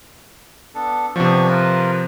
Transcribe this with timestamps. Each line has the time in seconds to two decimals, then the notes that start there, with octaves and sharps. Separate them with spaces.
0.75 B3 D4 A4
1.16 C3 F3 B3 D4 C#6
1.48 F4 A#4 B4